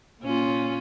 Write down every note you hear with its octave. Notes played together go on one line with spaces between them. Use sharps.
A#2 C#4 F4